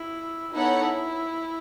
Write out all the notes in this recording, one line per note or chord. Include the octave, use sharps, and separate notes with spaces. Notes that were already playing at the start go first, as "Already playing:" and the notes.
Already playing: E4
B3 D#4 E4 A4 C#5 F#5